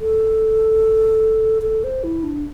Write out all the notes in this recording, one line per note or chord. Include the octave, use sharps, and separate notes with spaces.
A4
A4
C5
E4
D4